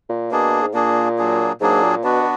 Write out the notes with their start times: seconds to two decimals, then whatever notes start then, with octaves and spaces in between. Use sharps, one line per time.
0.09 A#2
0.31 B2 A#3 D4 G#4
0.62 G#2
0.74 A#2 A#3 D4 G#4
1.18 F#3 A#3 D4 G#4
1.60 G#2 F#3 A#3 D4 G#4
1.83 A#2
2.04 B2 B3 D4 F#4
2.21 B2